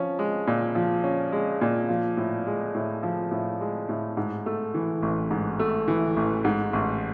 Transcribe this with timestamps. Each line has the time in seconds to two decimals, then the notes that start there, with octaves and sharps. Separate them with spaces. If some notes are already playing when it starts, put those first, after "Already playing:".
Already playing: F3 C#4
0.19 G#3
0.47 A#2
0.75 F3
1.04 C#4
1.33 G#3
1.61 A#2
1.89 F3
2.17 A2
2.47 G#3
2.75 A2
3.03 F3
3.31 A2
3.61 G#3
3.89 A2
4.17 G#2
4.46 A3
4.74 E3
5.02 A1
5.31 G#2
5.59 A3
5.88 E3
6.17 A1
6.44 G#2
6.73 A1